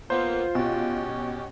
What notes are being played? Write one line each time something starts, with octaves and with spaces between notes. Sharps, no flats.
A#3 B3 F4 C5
B2 C#4 G4